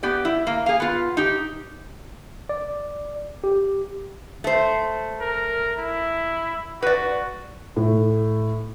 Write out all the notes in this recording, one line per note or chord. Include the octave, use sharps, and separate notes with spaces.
B3 G4 D5
E4
A#3
G#4 F5
B3 F4
D#4 G4
D5
G4
A3 C5
A#4
E4
F#4 B4 D5
A2